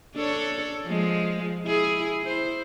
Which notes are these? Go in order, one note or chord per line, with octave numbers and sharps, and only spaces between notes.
D4 A4 C#5
F3 G#3
E4 G#4
E4 C5